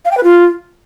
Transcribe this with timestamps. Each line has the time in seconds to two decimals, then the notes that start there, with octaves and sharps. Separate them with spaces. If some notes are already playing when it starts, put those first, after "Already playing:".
0.05 F5
0.11 G5
0.17 B4
0.24 F4